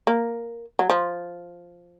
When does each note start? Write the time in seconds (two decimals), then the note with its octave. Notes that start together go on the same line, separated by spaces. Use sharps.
0.07 A#3
0.79 F#3
0.90 F3